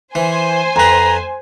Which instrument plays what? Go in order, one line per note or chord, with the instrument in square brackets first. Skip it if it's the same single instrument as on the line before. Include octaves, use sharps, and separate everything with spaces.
[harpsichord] E3 [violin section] C5 G#5
[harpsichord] F2 B4 [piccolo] A#5